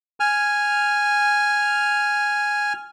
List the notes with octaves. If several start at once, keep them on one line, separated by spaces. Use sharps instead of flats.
G#5 F6